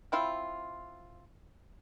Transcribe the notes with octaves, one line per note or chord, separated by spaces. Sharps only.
C4 E4 F4